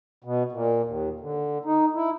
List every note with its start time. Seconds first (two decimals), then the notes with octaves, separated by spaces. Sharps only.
0.24 B2
0.52 A#2
0.85 D#2
1.20 D3
1.65 D#4
1.95 E4